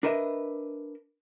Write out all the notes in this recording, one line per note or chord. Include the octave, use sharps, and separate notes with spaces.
D4 A#4 B4 D#5 E5